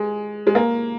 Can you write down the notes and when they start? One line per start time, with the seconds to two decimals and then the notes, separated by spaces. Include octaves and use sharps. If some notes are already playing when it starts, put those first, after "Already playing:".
Already playing: G#3
0.47 G#3
0.55 A#3